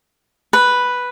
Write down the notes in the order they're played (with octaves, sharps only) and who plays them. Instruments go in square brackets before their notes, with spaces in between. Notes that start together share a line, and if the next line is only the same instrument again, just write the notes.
[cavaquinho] B4